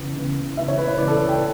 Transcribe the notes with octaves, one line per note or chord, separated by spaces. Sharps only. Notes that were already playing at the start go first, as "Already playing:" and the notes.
Already playing: C#3 E3 B3
C#3 E3 B3
C#3 E3 B3 E5
C#5
B4
C#5
C#3 E3 B3 D5
A4
B4
G5